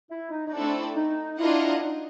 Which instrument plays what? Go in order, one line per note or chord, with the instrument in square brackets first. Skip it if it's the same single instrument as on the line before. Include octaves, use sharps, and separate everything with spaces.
[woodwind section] E4
D#4
D#4
[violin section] A3 C4 E4 A4 D5 [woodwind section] D4
[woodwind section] D#4
[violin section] D4 F4 A#4 D#5 F#5 [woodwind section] E4
[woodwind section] D#4